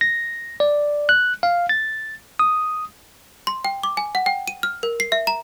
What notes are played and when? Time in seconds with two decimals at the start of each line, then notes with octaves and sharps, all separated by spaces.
0.01 A#6
0.60 D5
1.09 F#6
1.43 F5
1.69 A6
2.39 D#6
3.47 C6
3.65 G5
3.83 D6
3.97 G#5
4.15 F#5
4.26 G5
4.48 D#7
4.63 F6
4.83 A#4
5.00 C7
5.12 E5
5.27 A#5